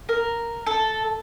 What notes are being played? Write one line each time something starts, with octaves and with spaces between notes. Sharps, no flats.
A#4
A4